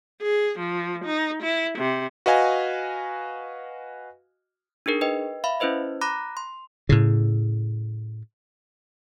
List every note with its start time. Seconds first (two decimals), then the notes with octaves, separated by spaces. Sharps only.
0.22 G#4
0.58 F3
1.04 D#4
1.42 E4
1.78 C3
2.26 F#4 B4 D#5 F5 G#5
4.86 D4 D#4 G#4 A#4
5.01 B4 D#5 G5
5.44 E5 F5 B5
5.60 C#4 E4 B4 C5 D#5
6.01 A#5 B5 D6 F#6 A#6
6.37 C6
6.89 A2 C#3